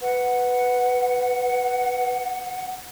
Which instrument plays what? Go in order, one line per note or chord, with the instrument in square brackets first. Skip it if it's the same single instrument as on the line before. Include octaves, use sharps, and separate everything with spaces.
[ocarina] B4 [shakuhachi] F#5